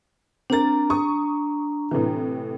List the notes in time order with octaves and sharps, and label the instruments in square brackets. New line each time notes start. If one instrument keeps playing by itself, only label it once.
[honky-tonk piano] C4 A#4 A6 [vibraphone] D4 A#5
[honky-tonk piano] C#6 D#6
A2 C3 E3